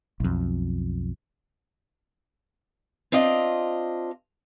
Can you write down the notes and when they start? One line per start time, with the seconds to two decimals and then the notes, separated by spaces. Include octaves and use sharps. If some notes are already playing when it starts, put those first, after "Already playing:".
0.20 B1 F2
3.12 C4 D4 F4 D#5